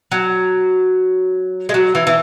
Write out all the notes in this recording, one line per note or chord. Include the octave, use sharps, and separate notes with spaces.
F#3
G#3
F#3
E3
E3